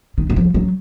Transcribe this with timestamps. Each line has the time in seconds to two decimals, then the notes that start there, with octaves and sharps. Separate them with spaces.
0.18 D#3
0.30 D#3
0.36 F3
0.54 F#3